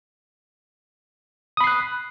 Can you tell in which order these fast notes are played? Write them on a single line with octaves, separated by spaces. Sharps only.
D#6 B5 C7 F#6